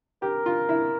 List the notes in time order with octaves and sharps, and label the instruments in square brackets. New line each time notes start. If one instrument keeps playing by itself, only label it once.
[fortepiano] G4 [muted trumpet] A#4
[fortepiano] F4
E4